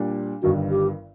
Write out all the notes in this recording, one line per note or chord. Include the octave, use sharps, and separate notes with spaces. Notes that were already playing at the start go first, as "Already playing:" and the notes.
Already playing: A#2 G3 D4
G1 G2 D#3 F#4
G4